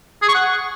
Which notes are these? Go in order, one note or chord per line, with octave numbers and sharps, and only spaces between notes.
G#4
C#6
F#5